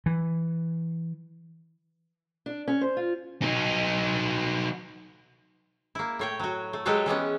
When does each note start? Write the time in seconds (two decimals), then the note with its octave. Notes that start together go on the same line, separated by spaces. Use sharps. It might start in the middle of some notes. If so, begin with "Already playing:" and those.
0.06 E3
2.46 D4
2.68 C#4
2.81 C5
2.97 F4
3.42 F#3 D#4
5.95 A#3 E4
6.19 A2 C#5 G5
6.39 F#3 F#4
6.73 A3
6.85 F#3 G#3 G4 A4 B4 C#5
7.06 E3 G#3 B3 C#4